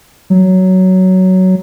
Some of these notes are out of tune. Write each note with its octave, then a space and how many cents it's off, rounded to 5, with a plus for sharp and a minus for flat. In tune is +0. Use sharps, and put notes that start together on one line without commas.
F#3 +10